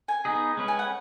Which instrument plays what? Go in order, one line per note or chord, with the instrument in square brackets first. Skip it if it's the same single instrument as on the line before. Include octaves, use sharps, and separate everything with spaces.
[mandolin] G#5
[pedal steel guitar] B3 D#4 G#4
G#3 C#4 B4
[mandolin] G#5
F#5